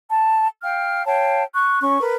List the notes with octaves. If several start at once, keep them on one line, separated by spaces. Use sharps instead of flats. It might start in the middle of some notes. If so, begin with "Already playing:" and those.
A5
F5 G5 F6
C#5 F5 G5 A5
C#6 F#6
C#4 C#6
A#4 B4